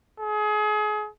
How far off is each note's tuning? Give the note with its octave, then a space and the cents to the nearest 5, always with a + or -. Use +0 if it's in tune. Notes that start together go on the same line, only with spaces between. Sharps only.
G#4 +30